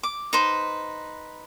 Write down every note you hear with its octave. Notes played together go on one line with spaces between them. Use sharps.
D6
D#4 B4 C5